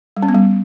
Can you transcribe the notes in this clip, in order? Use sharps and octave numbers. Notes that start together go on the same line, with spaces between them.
G3
C#4
B3
G3